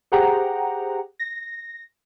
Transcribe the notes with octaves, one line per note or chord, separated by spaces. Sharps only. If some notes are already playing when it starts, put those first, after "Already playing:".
G4 G#4 C5 F#5 G5 A#5
A#6